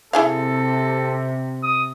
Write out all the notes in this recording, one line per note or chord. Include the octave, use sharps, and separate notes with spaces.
C3 E4 G#4 A4 F5
D#6